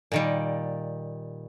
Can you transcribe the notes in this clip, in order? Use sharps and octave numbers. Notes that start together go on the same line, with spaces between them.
A#2 D#3 G3